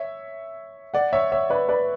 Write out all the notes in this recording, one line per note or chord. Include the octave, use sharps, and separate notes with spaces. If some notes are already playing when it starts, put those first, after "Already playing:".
Already playing: C#5 E5
D5 F#5
C#5 E5
C#5 E5
B4 D5
B4 D5